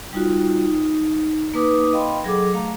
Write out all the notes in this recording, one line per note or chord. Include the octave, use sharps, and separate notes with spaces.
G3 D#4 F4 F#4
D#4
A#3 D#4 B4 D6 D#6
D#5 F5 G5 B5 C6
F#3 G#4 A4 D6
A3 F5 A#5